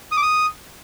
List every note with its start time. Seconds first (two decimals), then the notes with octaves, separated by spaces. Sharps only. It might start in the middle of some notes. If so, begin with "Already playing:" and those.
0.12 D#6
0.17 D6
0.22 D#6